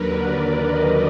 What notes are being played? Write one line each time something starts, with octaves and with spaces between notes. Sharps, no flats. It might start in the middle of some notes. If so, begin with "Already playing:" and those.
Already playing: D#2 D3 F#3 A#4 B4
D5
D#5